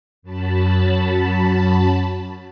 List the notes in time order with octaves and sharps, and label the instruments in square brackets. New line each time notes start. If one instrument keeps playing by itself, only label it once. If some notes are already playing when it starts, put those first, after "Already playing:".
[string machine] F#2 F#3 A5 B5